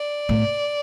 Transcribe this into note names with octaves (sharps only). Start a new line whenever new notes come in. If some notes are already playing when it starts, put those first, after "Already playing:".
Already playing: D5
A2